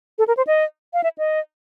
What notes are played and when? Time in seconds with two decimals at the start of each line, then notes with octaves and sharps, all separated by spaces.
0.19 A4
0.28 A#4
0.37 C5
0.47 D#5
0.94 F5
1.04 E5
1.18 D#5